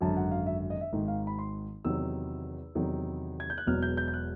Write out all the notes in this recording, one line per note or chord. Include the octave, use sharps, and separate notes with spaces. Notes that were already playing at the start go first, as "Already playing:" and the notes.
G#1 F#2 D3 F#3 A5
F#5
F5
E5
D#5
E5
G#1 G#2 D#3
F5
B5
C6
E2 C3 D#3 F#3 E6
E2 C3 D#3 F#3
G#6
G6
F#6
E1 E2 B2 F#3 F6
G6
G6
G6
F#6